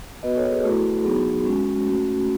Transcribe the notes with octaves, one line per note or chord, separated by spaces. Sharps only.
B3 F#4 B4 D#5
A4 C#5
G#4 B4
A3 E4 F#4 A4
F#3 B3 D#4 F#4 G#4
G#3 C#4 F#4
A3 C#4 F#4